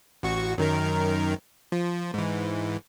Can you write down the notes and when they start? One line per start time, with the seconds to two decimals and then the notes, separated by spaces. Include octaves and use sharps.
0.23 A1 F#4 C#6
0.58 F#2 D#3 A#4
1.72 F3
2.14 G#2 E3